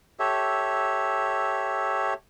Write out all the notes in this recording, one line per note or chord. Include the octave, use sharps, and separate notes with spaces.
G4 A4 C#5 E5